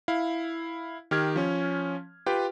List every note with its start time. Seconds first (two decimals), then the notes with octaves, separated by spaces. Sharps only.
0.08 E4 F5
1.11 D#3 G4 F6 G#6
1.36 F3 C#4
2.26 F4 G4 B4 G5